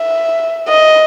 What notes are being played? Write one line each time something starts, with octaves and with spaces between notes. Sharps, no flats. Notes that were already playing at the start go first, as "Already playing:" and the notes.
Already playing: E5
D#5